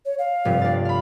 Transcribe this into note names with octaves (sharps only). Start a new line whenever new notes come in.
C#5
F5
F1 G2
D4 A6
F5 B5